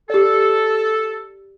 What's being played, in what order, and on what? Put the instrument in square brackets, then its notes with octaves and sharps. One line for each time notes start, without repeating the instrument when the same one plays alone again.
[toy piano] G4 D5 [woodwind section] A4